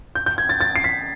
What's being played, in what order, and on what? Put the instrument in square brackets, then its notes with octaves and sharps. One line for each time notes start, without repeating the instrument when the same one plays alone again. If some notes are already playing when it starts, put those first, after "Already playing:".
[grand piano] G6
G6
G#6
A6
A6
C7
B6